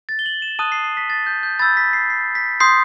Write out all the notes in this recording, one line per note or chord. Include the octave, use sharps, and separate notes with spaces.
A6
G7
F#7
E7
A5 D#6 F#6 D#7
C7
C7
B6
A6
G6
G6
B5 E6 G6 A6
B6
C7
C7
B6
C6 D#6 G6 C7